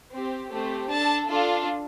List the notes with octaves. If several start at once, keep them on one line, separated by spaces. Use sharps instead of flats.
C4 G4
A3 C4 G4
D4 A4 A5
D4 F4 A4